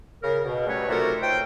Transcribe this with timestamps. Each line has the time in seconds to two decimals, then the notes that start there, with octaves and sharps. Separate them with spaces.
0.23 C#3 A#4
0.44 B2
0.66 F#3 G3 A3 C#4 B4 C#5
0.88 C3 A3 D#4 F4 F#4 A#4
1.21 C#2 C5 G5